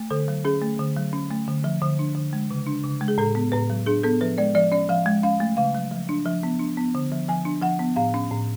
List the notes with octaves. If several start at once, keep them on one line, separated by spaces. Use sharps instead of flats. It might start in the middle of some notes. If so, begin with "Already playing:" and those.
Already playing: A3
D3 A4
F#3
C#4 G#4
A3
D3
F#3
C#4
A3
D3
F3
D3
D4
D3
G#3
C#3
D4
C#3
G#3
G#4
A2 A4
B3
A2 B4
F#3
D4 G#4
B3 A4
F3 B4
G#3 D5
F3 D5
C#4 D5
F3 F5
G#3
C#4 F5
A3
C#3 F5
F#3
F3
D4
F3
B3
D4
B3
D3
F3
F3 G#5
D4
F3 F#5
B3
A2 F5
C#4
A2